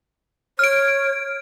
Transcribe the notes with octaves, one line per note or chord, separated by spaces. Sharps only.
C#5 F6 D7